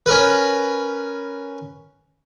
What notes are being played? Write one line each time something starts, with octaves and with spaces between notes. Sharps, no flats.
C#4 A#4 B4